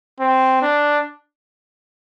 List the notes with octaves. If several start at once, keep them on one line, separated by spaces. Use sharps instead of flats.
C4
D4